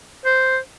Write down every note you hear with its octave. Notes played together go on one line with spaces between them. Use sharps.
C5